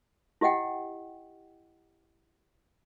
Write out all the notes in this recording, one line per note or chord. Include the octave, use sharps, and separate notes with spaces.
E4 G4 D#5 F#5 G5